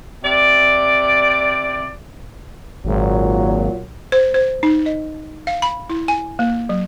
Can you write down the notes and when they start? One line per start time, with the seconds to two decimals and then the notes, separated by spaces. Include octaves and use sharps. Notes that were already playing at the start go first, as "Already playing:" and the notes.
0.23 C3 D5
2.85 G#1 A#2 F#3
4.12 C5
4.34 C5
4.63 D#4
4.86 D#5
5.47 F5
5.62 B5
5.90 E4
6.08 G#5
6.39 A#3
6.69 F#3